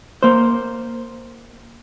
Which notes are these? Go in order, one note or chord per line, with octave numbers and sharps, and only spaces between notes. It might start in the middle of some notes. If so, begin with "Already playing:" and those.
A#3 C5